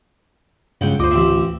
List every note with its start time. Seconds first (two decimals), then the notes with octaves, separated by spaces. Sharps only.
0.81 C#2 G2 C#3 F#5 G5
0.99 D2 F4 C5 D#5 D6
1.11 A1 C4 E5